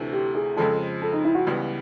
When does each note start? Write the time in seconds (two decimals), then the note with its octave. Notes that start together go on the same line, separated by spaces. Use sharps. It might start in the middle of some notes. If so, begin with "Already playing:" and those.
Already playing: D2 C3 E3 A3
0.13 G4
0.35 G#4
0.57 F2 C#3 F3 G#3 A4
1.02 A4
1.13 D#4
1.24 E4
1.35 F#4
1.46 C#2 C#3 E3 G3 B3